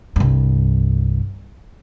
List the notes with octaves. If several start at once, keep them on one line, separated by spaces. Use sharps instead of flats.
C2 G2